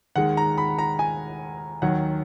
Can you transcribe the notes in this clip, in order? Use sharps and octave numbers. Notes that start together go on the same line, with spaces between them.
D#2 D#3 G#3 F#5
A#5
B5
A#5
G#5
D#2 D#3 F#3 F#5